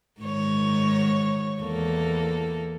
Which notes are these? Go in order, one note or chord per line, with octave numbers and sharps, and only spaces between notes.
G#2 D#3 C#5
E2 A#3 A4